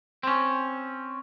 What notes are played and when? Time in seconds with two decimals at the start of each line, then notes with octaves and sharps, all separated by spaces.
0.23 C4 C#4